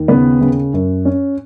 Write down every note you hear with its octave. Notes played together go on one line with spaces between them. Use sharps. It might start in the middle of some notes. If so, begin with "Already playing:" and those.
Already playing: D#2
C#3 B3 B4
C#3
F#2
C#4